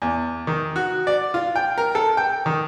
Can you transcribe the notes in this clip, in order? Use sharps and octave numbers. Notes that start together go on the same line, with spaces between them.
E2
D#3
F#4
D5
F4
G5
A#4
A4
G5
D#3